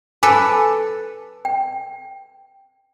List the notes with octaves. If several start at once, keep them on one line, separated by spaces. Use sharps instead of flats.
A4 B4 G#5 D6
G5